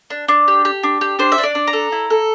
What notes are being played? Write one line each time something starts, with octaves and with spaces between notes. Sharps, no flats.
D4
D4
G4
G4
D4
G4
D4 C5
E5
D4
D5
D4
A#5
A4
E4
A4